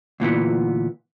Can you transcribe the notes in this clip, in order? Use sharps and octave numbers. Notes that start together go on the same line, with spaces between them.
D2 A#2 E3 B3